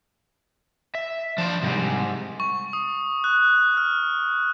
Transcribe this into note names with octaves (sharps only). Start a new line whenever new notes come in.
E5
F3 D4 C5
G#2 C3 G3 G4
C#6
D#6
F#6
F6